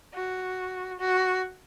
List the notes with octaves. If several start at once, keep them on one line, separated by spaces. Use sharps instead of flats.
F#4
F#4